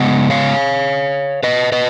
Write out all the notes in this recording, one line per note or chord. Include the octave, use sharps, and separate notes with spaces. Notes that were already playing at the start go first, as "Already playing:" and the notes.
Already playing: C#3 G#3 B3 D#5 F#5
C#5 F5
B4 D#5
B4 D#5